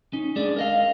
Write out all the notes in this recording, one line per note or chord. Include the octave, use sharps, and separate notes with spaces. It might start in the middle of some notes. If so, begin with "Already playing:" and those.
C#4 D#4
G#3 D4 G#4 D5
A#4 D#5 F5